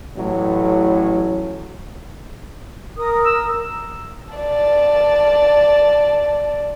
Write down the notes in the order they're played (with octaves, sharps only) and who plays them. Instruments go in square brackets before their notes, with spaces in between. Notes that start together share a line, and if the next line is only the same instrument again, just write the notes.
[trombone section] A1 A2 E3 F#3
[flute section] A#4 D#6
[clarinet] E6
[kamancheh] D5 A5